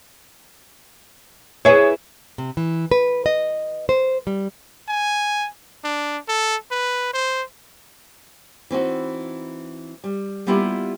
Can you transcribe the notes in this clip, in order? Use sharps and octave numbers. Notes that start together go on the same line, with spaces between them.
E4 G#4 B4 C#5
C3
E3
B4
D#5
C5
G3
G#5
D4
A4
B4
C5
E3 C4 D#4 F#4
G3
G3 A#3 B3 E4 F4 G4